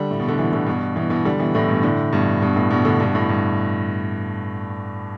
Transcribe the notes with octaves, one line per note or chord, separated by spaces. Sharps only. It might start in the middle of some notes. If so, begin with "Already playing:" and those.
Already playing: D3 G3
A2
B2
D3
B2 E3
A2 D3
G2 B2
B2 E3
B2 E3
D3 G3
B2 E3
A2 D3
G2 B2
A2 D3
G2 B2
G2 B2
A2
G2 B2
A2 D3
G2 B2
A2
G2